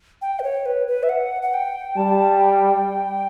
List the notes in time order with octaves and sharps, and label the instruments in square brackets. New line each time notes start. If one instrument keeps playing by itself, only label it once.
[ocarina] G5
B4
C#5
B4
B4
E5
F#5
F#5
G5
[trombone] G3 [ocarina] A5
[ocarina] G5